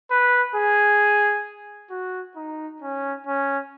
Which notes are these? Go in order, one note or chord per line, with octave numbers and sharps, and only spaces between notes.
B4
G#4
F#4
D#4
C#4
C#4